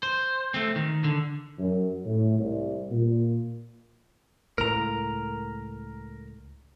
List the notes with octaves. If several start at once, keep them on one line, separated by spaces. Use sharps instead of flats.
C5
A3 C4
D#3
D3
F#2
A2
C2
A#2
C#2 A2 A#4 A#5